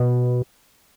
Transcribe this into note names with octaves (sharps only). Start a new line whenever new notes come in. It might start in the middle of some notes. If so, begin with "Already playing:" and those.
Already playing: B2